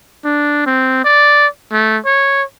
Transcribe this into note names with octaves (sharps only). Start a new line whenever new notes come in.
D4
C4
D5
A3
C#5